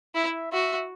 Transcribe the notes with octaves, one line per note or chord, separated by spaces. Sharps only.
E4 E5
F#4 E5